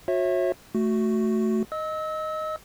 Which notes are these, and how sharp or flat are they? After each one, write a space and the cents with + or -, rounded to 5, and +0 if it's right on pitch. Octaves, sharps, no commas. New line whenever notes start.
F#4 -35 C#5 -30 E5 +0
A3 +0 F#4 +0
D#5 +0 E6 -30